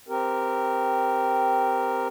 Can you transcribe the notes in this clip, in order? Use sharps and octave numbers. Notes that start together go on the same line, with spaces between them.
C4 G4 A#4